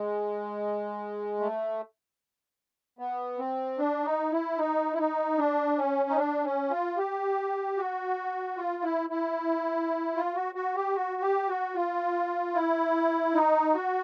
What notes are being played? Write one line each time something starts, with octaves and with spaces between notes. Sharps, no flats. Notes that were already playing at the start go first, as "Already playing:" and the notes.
Already playing: G#3
A3
B3
C4
D4
D#4
E4
D#4
E4
D#4
D4
C#4
D#4
D4
C#4
F4
G4
F#4
F4
E4
E4
F4
F#4
F#4
G4
F#4
G4
F#4
F4
E4
D#4
F#4